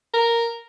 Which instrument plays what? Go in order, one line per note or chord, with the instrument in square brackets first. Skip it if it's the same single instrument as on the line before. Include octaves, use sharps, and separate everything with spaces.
[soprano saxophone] A#4